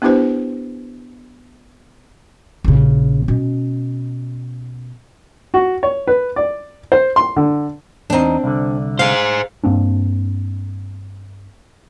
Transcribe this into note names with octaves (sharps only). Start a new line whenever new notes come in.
B3 D4 E4 G4 B4 C5
A#1 C#3
B2 C#4
F#4
C#5
B4
D5
C5
C6
D3
E2 C4 D4 D#4
C2 D3
G#4 C5 F5
G2 A#3 C4 D4